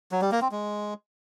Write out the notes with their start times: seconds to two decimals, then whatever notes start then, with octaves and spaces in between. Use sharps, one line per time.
0.12 F#3
0.22 G3
0.32 A#3
0.41 C4
0.51 G#3